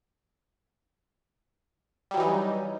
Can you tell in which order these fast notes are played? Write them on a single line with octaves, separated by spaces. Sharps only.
G3 F#3 E3 D#4